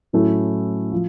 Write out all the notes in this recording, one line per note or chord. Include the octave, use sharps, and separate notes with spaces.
A2 F#3 A3 C#4 E4
F3